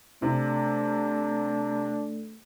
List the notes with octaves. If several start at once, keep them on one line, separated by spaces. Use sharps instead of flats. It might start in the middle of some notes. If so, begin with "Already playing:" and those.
C3 A3 D4